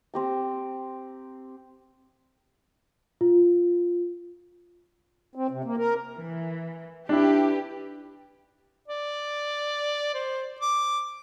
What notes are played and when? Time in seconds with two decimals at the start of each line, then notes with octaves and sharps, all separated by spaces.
0.14 C4 G4 A#5
3.21 F4
5.35 C4
5.50 C3
5.64 A#3
5.77 A#4
6.15 E3
7.09 D4 E4 G4 B4
8.88 D5
10.14 C5
10.60 D6